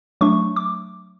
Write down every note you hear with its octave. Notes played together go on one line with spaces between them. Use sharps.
F#3 A3 D4 C#6
D6